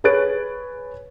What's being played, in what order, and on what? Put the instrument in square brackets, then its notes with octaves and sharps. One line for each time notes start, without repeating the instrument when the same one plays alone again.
[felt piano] G#4 B4 C#5 F#6 A6 D7